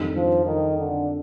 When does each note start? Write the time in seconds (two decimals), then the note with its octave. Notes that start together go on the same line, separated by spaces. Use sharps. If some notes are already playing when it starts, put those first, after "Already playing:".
Already playing: F2 D#3 G3 D4
0.15 F3
0.46 D#3
0.78 D3